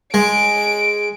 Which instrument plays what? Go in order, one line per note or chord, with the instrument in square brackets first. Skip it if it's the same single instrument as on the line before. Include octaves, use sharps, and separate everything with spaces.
[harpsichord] G#3 [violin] D7